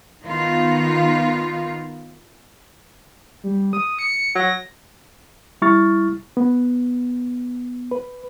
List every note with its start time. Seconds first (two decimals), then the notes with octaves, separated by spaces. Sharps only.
0.22 D#3 B3 D#4 F4
3.44 G3
3.73 D#6
3.99 C#7
4.35 F#3 A#6
5.62 G3 E4 C#6 F6 A6
6.37 B3
7.91 B4